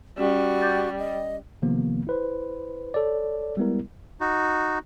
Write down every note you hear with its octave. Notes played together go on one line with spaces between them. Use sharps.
G3 C#4 F#4
D6 G6 A6
D#5
C3 D#3 F3 A#3 B3
E4 B4 C5
A4 C#5 D5
G3 G#3 B3 E4 A#4
D#4 F#4